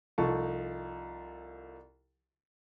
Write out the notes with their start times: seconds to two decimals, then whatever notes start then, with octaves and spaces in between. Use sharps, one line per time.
0.18 C2 F3 D#4 A4 A5 C#6